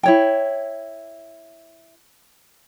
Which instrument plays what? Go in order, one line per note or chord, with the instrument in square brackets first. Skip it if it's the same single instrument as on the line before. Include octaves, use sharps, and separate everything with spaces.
[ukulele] E4 C#5 G5